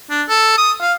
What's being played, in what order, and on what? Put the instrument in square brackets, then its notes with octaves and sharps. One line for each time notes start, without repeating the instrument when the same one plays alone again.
[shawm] D4
A4
D#6
F5